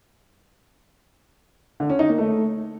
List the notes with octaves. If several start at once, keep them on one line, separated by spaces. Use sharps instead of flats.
D3
C#4
D#4
A#3
A3